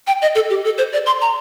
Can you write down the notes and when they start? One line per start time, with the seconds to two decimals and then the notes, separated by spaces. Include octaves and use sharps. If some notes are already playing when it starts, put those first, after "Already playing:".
0.07 G5
0.22 D#5
0.35 A4
0.50 G4
0.65 A4
0.78 C5
0.93 D5
1.06 C6
1.21 A#5